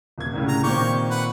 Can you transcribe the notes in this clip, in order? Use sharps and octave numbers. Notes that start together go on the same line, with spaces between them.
D#1 G#6
C2 A2 C#3
A#5
A#2 D#3 C4 G4 C#6
B4 F#5